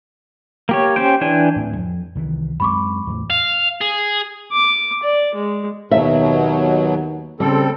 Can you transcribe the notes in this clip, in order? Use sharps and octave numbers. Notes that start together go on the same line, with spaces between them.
A#3 G4 C#5
C#4 G4 C5 G5
E3 D4 G5 G#5
D1 A2 C4
F2
C2 D#3 E3
F#2 G#3 C4 B5 C#6 D6
E2 A2
F5
G#4
D6
D5
G#3
D#2 B2 F#3 E5
C#3 G3 C4 A4